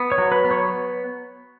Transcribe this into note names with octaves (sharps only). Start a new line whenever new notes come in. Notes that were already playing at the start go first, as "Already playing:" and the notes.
Already playing: B3
C#5
F#3
B4
B3
C#5